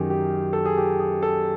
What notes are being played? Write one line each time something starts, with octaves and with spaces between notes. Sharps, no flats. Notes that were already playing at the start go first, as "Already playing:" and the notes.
Already playing: F#2 D#3 F#3 G4 G#4
G4
A4
G#4
G4
G#4
A4